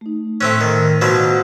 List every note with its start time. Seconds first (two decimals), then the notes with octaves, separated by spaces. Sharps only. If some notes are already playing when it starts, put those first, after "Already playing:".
0.01 A3 D#4
0.41 A2 A3 C4 C#4 F#6
0.61 D#3
1.01 B2 F3 F#3